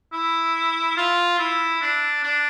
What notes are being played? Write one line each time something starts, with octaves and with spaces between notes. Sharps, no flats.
E4
F4
E4
D4
D4